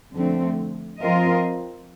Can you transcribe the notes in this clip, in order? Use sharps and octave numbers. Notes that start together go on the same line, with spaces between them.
F2 D3 A3 C4
F3 C4 F4 A#4 D#5